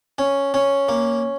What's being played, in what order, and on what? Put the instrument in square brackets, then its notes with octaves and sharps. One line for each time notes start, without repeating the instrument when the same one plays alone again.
[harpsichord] C#4
C#4
A#3